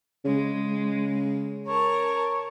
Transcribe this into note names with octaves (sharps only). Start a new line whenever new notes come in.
C#3 G#3
A#4 C#5 A5